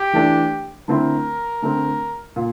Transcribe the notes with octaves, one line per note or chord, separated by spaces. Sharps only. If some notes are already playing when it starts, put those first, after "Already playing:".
Already playing: G4
E3 A3 D4
D3 A3 C4 E4 A#4
D3 A3 C4
A#2